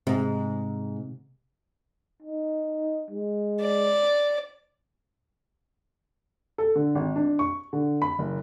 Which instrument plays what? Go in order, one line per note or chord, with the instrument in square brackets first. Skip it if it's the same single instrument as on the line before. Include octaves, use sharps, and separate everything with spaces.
[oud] G#2 [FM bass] C3
[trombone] D#4
G#3
[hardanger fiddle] D5
[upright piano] A4
D3
G#1
D4
C#6
D3
B5
F#1